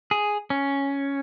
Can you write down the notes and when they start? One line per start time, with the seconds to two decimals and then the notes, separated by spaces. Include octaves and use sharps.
0.11 G#4
0.50 C#4